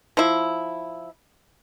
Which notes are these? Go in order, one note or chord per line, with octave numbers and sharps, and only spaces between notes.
F3 E4